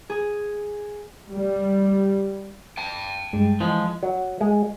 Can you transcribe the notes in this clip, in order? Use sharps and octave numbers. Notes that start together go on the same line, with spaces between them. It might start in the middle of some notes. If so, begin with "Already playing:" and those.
G#4
G3
G5 A5
G2 G#3
E3 F3 G#3
F#3
G#3